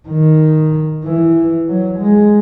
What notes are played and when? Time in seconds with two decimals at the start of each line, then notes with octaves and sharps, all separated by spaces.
0.09 D#3
1.05 E3
1.68 F#3
1.99 G#3